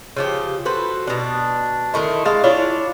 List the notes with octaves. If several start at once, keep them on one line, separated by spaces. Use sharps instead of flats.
C#3 F3 G4
F#4 A4 B4 C5
B2 D4
D3 D#3 A3 E4
G#3 F5 A5
D4 E4 F4 C#5